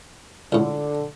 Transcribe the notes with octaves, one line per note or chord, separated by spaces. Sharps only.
C#2 A2 D3